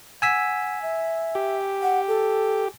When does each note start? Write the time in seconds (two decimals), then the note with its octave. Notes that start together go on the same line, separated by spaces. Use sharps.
0.22 F#5 G#5 E6 B6
0.82 E5
1.35 G4
1.82 F#5
2.08 A4